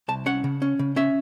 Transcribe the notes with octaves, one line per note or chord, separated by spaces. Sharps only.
C2 A5
C#4 F#5
C#3
C#4
C#3
C#4 E5